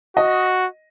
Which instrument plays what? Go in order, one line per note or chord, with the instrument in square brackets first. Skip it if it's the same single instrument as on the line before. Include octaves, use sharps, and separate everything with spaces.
[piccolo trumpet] F#4 [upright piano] D#5